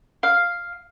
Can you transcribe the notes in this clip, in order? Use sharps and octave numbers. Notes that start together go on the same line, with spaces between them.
F5